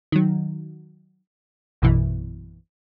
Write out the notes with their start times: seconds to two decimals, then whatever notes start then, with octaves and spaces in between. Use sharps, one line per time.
0.12 D#3 F#3
1.82 A#1 F#2 B2 E3